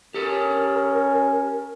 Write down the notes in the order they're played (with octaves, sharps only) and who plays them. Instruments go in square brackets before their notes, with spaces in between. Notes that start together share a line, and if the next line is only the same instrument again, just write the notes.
[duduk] C#4 [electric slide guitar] G4 A4 [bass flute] A#4